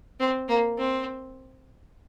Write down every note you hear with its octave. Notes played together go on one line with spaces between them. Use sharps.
C4
A#3
C4